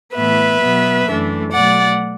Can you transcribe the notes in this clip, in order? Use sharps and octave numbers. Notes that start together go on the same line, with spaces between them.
A2 E3 B3 B4 E5
B2 F#3 B3
F#2 E3 A3 D4
B2 F#3 A3 D5 F#5